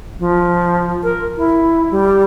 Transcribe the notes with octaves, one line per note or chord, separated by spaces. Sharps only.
F3
A#4
E4
G3